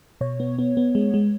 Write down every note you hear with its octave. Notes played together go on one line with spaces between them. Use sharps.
B2 C#5
B3
B3
B3
G#3
G#3